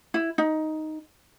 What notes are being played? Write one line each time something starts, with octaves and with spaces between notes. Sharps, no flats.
E4
D#4